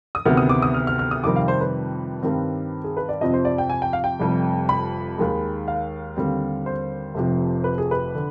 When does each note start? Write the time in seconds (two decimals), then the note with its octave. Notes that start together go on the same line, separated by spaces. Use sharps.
0.15 D#6
0.25 D2 C3 D#3 B3 F6
0.37 D#6
0.49 D6
0.62 D#6
0.74 F6
0.87 F6
0.99 F6
1.11 D#6
1.23 F2 C3 D#3 G3 C4 D6
1.36 F5
1.48 C5
1.61 B4
2.23 G2 D#3 G3 C4
2.84 G#4
2.97 B4
3.09 D5
3.21 F2 C3 F3 C4 D#5
3.34 C5
3.45 D5
3.58 G5
3.70 G#5
3.82 G5
3.93 F5
4.04 G5
4.19 F1 F2 C3 G3
4.69 B5
5.17 D#2 D#3 G#3
5.68 F5
6.16 D#2 D3 G3 C4
6.66 C5
7.14 F1 F2 C3 F3
7.64 B4
7.78 G#4
7.91 B4
8.15 D3